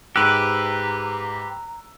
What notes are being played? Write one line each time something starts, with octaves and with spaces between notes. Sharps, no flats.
G#2 G4 B4 A#5 E6 F#6